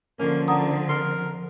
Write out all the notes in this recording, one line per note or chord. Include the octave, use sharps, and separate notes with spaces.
D3 F3 A#3 C#4
D4 F#5 A#5 D#6
F2 A#4 C6